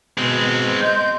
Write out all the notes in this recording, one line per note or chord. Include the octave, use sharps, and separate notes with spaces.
B2 G#3 C4
D#5 C6 G6